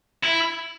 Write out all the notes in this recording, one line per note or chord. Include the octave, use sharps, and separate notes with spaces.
E4